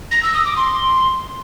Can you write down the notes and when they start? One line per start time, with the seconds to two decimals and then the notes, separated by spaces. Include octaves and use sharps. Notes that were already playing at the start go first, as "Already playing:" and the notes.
0.11 A#6
0.23 E6
0.34 D#6
0.45 D6
0.57 C6